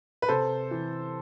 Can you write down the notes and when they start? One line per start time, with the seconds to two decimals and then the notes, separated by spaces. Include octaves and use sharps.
0.22 B4
0.28 C3 A4 C5
0.71 E3